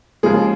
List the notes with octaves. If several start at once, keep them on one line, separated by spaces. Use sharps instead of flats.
D#2 C#3 F3 G#3 G#4